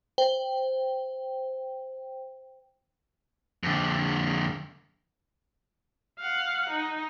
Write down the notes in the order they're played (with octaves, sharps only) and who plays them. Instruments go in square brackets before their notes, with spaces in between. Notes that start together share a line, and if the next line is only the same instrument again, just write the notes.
[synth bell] C5 G5
[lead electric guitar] F2 D3
[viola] F5 F#5
D#4